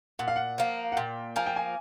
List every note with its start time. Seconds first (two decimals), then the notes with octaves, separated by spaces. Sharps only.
0.19 A#2 F#5
0.28 F5
0.36 F#5
0.58 F3 A#3
0.92 F#5
0.97 A#2 G5
1.36 F3 A#3 G#5
1.46 G5
1.56 G#5